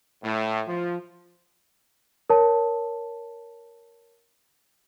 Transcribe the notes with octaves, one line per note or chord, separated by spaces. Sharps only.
A2
F3
A#4 C#5 A5